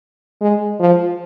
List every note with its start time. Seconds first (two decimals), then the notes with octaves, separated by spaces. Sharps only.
0.41 G#3
0.80 F3